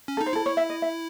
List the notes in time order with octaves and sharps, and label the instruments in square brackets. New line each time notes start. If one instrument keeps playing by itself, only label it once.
[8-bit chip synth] C#4
[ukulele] A4
[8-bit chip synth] D#4
[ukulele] C5
[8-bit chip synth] E4 [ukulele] A4
[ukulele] C#5
E5
D#5
E5